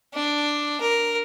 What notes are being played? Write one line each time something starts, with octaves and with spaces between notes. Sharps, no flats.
D4
A#4